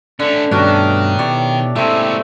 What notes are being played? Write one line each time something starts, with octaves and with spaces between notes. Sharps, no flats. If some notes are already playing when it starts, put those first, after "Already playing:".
D3 A3 C#4 D4
G2 B2 D#3 A3 C#4 D4 F#4
B2 E4 G4 C#5 D5
A#2 G#3 A3 C4 E4 A5